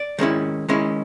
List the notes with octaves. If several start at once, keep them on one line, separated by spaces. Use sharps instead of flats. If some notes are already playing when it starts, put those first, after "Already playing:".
Already playing: D5
D#3 G#3 C#4 E4
D#3 G#3 C#4 E4